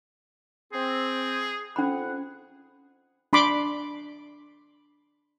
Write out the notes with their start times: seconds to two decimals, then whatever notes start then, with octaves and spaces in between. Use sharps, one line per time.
0.73 C4 G#4
1.76 F2 C#4 F#5 B5
3.33 D4 B5 C6 D6